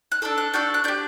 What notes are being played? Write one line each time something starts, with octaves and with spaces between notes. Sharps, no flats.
F#6
D4 A4 E6
F#6
D4 F#4 A4 G6
F#6
D4 G4 G6